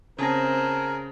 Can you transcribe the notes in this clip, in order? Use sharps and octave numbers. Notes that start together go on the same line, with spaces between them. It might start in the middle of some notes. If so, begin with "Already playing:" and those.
C#3 C4 G#4 A#4 A5 A#6